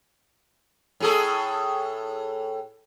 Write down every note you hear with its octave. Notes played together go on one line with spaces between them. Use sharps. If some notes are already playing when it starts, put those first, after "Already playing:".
A2 G#4 A4